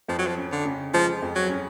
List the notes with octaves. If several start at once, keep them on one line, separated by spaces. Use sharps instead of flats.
F2 F3
F#3
F3
C#4
D3
C#3
F3 G#3
F2
F#3
C#4